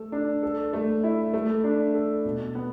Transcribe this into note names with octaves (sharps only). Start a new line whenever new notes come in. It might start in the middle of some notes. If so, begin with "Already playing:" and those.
Already playing: A3 A4
D4
A4
A3
E4
A3
D4
A4
B2
B3